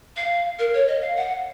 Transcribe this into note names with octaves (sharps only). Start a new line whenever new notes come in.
F5
A#4
C#5
D#5
F5
F#5